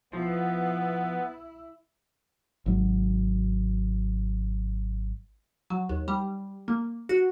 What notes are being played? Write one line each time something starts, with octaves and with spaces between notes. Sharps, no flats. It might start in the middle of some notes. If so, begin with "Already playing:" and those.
F3 B3 E4
G#1 F#3
F#3
D#2
G3
A#3
F#4